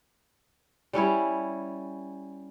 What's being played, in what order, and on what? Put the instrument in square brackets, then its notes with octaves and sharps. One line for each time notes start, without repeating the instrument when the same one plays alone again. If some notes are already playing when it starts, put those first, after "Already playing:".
[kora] G3 C#4 E4 C#5